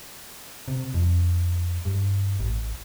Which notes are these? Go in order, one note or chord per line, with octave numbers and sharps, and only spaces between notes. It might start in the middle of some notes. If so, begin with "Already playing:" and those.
C3
F2
G2
A1